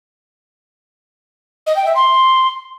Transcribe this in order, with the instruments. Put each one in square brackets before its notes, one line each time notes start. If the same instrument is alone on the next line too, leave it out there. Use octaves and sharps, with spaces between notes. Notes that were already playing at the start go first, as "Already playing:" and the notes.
[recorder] D#5
G5
E5
C6